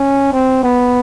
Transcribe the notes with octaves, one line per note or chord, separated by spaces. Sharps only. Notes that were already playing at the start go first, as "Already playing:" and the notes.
Already playing: C#4
C4
B3